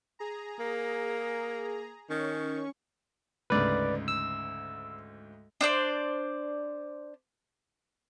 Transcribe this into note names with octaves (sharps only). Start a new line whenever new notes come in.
G#4 A#5
A#3
D#3 C#4 C#6
D2 G#2 C#3 B4 D5
E6
D4 C5 D5